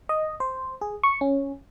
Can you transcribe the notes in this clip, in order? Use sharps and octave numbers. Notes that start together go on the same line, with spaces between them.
D#5
C5
G#4
C#6
C#4